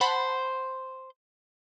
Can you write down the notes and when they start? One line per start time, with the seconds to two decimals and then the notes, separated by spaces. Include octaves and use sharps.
0.01 C5 F#5 A5 B5